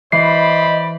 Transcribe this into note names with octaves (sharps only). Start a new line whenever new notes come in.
E3 C5 D5 D#5 B5 C7